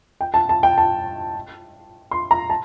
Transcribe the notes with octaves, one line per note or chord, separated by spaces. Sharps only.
G5
A5
A5
G5
A5
C6
A#5
A5